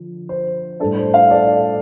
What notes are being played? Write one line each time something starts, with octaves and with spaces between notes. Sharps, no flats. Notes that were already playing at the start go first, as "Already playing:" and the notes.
Already playing: D3 F3
C5
A2 G3 D4 A4
C5
C5 F5
A4 D5